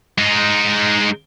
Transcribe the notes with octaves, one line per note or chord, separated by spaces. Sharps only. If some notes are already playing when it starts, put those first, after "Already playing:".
G#3 D#4